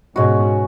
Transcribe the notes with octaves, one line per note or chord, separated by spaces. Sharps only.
G#2 B2 G#3 C#4 F#4